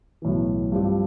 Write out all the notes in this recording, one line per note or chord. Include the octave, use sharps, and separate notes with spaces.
B1 A2 E3
G2 F3 C4 G4